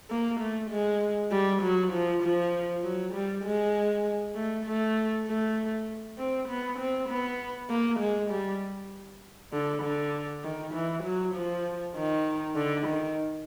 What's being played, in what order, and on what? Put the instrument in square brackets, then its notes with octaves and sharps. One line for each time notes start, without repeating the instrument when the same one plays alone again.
[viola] A#3
A3
G#3
G3
F#3
F3
F3
F#3
G3
G#3
A3
A3
A3
C4
B3
C4
B3
A#3
G#3
G3
D3
D3
D#3
E3
F#3
F3
D#3
D3
D#3